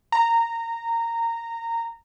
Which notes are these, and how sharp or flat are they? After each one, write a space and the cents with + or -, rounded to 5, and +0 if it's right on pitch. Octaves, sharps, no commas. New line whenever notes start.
A#5 -15